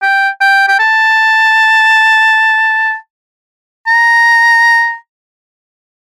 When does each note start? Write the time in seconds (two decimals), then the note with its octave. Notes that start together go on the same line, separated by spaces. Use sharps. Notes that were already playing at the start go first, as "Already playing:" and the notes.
0.02 G5
0.41 G5
0.68 G5
0.79 A5
3.87 A#5